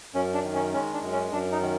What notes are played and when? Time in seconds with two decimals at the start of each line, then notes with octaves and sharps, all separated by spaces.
0.14 F#2 C#4
0.34 D4
0.43 D#3
0.54 C#4
0.74 G#3 C#4
0.93 D4
1.03 F#2
1.12 C#4
1.32 F#2 D4
1.52 D#4
1.61 D#3